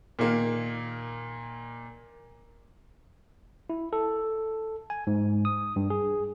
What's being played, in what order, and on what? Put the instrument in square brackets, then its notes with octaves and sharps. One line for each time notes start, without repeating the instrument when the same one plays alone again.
[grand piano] A#2 D#3 A#3
[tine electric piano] E4
A4
G#5
G#2
D#6
G2
G#4